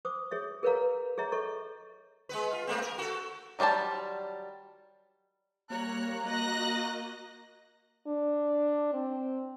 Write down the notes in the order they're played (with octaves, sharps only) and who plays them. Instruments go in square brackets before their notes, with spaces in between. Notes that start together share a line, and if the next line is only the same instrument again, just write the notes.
[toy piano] C5 D6 D#6
G#4 C#5 E5
G#4 A#4 B4 C#5 F5 A#5
G#4 C#5 E5 A#5
A4 C#5 D#5 C#6
[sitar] G#3 B3 B4
F4
G#3 A#3 C4
A#4
F#4 A4
[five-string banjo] D#3 F#3 G3 C5 A5
[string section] G3 C#5 F#6 [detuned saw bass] A#3 [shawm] A#5
[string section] F#4 D#5 [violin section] F#6 A#6
[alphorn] D4
C4